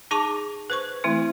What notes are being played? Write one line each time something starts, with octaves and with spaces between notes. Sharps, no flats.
D#4 G#4 A5 C#6 D6
B4 C5 C#6
E3 A3 C4 E4